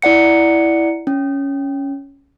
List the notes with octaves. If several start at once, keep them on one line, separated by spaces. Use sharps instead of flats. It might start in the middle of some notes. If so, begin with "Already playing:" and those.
E4 D5 F#5 C#7
C#4